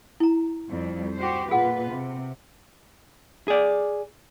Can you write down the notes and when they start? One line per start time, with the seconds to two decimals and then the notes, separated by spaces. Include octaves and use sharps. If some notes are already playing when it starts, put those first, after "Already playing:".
0.20 E4 A#5
0.70 F2 G3
1.16 F#4 G4 C5
1.51 A#2 F4 G#4 B4 F#5
1.91 C3
3.48 G#4 D5